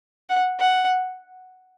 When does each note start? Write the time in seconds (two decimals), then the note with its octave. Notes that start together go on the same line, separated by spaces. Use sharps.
0.29 F#5
0.59 F#5